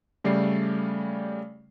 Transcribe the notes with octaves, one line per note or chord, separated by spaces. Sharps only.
C#3 G3 A3 D5 C7